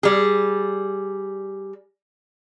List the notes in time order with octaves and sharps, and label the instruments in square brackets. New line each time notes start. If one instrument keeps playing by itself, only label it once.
[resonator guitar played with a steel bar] G3 G#4